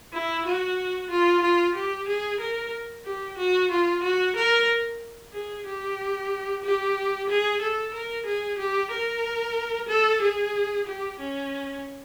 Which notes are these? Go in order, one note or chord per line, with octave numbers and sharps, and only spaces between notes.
E4
F#4
F4
F4
G4
G#4
A#4
G4
F#4
F4
F#4
A#4
G#4
G4
G4
G#4
A4
A#4
G#4
G4
A#4
A4
G#4
G4
C#4